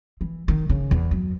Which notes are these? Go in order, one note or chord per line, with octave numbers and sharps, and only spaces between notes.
E3
D#3
C#3
E2
F#2